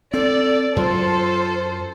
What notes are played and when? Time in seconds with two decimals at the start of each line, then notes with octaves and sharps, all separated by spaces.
0.14 C4 A4 D5
0.76 F#2 F#3 F4 A4 C5